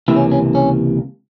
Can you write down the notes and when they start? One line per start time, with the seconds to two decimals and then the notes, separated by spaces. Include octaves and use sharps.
0.08 C#2 C3 E3 A#3 E4
0.16 C#4
0.32 C#4
0.55 C#4